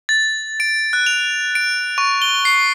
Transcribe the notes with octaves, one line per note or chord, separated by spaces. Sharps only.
A6
D7
F#6
F7
D7
C#6
G7
C7